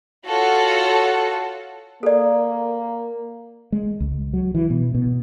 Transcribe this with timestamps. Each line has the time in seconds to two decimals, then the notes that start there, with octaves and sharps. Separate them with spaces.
0.27 F4 F#4 A4 C#5 F#5 A5
2.03 A#3 A4 D5
3.72 G#3
4.00 C#2
4.33 F#3
4.55 E3
4.70 B2
4.95 B2